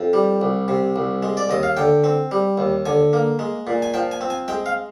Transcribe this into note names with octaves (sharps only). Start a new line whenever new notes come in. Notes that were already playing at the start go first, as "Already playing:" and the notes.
Already playing: F2
G3
C2
C3
C2
G#3
D5
D#2 D#5
F5
D3 G5
C4
G3
D#2
D3 G#5
A#3
G#3
A#2
G#5
F3 G5
G#5
C4
G#5
G#3 G5
F5